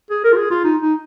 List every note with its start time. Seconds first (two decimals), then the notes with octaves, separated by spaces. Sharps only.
0.10 G#4
0.24 A#4
0.32 F4
0.37 G#4
0.51 F4
0.64 D#4
0.82 D#4